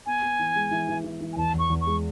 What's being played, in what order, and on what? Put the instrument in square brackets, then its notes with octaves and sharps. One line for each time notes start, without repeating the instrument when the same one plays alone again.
[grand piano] B3 [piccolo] G#5
[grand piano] B3
E3
G#3
E3
E3
E3
E3
[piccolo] G#5
[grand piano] E2 [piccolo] A5
[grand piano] E2
[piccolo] C#6
[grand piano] E2
[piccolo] C#6
[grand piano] G#3